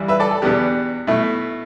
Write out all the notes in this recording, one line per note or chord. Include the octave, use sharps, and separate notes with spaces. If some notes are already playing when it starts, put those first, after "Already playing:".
Already playing: G2 E3 G3 E4
B4 E5
A4 D5
A4
E2 B2 B3 D4 G4
B2 A3 E4